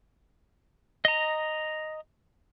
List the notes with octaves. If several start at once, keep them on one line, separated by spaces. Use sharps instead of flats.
D#5 A#5